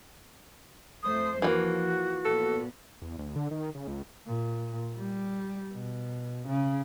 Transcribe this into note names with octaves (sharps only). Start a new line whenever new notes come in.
F2 A3 C5 D#6
E3 F3 A3 A#3 F#4
A#2 B3 A4
E2
D2
D3
D#3
C#3
C#2
A#2
G3
B2
C#3